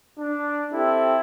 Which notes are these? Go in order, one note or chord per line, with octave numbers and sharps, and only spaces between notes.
D4
C4 E4 G4 A4